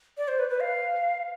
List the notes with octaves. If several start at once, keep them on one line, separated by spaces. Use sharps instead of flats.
D5
C5
B4
B4
F5